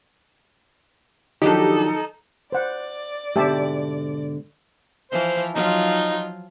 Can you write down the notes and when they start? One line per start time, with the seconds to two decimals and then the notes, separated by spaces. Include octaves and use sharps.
1.42 D#3 F3 F#3 D4 D#4 G4 A4
2.52 C5 D5 F#5
3.36 G#2 B2 D3 G4 E5 A5
5.11 E3 F3 C5
5.55 F3 F#3 D#4 F4